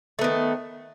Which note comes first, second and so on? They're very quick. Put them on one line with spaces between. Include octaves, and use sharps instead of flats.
A3 B3 D#3